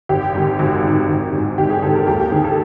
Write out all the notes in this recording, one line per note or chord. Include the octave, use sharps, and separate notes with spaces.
G#1 G4
G#2 D#3
G#1 F#4
G#2 D#3
G#1
G#2 D#3
G#1 G4
G#4
G#2 D#3 A4
A#4
D#2 G4
G4
D#3 G#4
A4